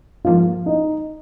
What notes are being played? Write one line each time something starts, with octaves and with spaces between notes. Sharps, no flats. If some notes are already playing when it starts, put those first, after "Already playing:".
G#2 F3 A#3 F4
D#4